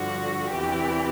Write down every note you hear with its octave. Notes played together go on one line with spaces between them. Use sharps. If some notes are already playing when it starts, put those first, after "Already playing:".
Already playing: G2 D3 F3 F#4
E2 C3 E3 G4